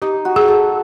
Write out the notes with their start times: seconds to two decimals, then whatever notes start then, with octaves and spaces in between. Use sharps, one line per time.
0.02 D#4 G4
0.25 F#4
0.36 G#4
0.48 A4